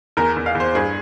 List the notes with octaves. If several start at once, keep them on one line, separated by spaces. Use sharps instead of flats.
E2 A#4
E2
F5
E2
C5
G2 G#4